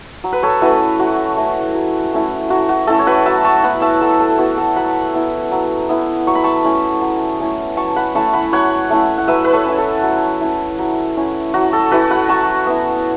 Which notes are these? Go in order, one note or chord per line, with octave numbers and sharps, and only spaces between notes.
F#3
B4
A4 C#5
A3 C#4 E4 F#4 B4
F#3 F#4
A3 C#4 E4
F#3
A3 C#4 E4
F#3 F#4
F#4
A3 C#4 E4 A4
C#5
F#4 B4
F#3 E5 A5
A5 C#6
B3 E4 F#5 B5
E5 A5
F#3 A4
A4
B3 E4 F#4
A4
F#3 F#5 B5
B3 E4
F#3
B3 E4
F#3 C#6
B5
A5 C#6
A3 C#4 E4
F#3
A3 C#4 E4
F#3 A5 C#6
F#5 B5
A3 C#4 E4 A5 C#6
F#5 B5
F#3 C#5 F#5
A3 C#4 E4
F#5
F#3 B4 E5
B4
A4 C#5
C#4 E4
A4
F#3
C#4 E4
F#3
C#4 E4
F#3 F#4
A4
C#4 E4 F#4 B4
F#5 B5
F#3 A5 C#6
B3 E4